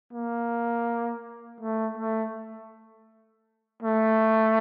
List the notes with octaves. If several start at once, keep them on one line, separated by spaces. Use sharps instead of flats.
A#3
A3
A3
A3